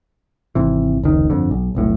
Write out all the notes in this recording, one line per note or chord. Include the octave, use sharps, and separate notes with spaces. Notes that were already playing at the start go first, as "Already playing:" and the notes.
G#1 C3 E3
F1 C#2 D#3
G1 F2 D3
B1
F1 B1 A2